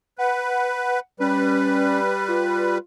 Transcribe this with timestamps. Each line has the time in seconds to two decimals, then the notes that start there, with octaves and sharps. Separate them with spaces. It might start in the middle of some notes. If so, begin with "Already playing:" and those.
0.18 B4 F#5
1.20 G3 C#4 B4
2.28 F4